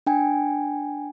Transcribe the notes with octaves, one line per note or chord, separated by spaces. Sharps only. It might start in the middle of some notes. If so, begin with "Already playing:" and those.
D4 G5 G#5